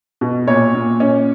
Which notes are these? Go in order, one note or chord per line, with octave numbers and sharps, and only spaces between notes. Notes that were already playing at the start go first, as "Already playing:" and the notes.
B2
A#2 C#5
A#2
C#4